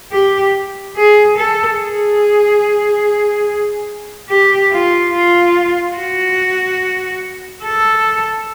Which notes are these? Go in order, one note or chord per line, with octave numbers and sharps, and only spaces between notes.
G4
G#4
A4
G#4
G4
F4
F4
F#4
A4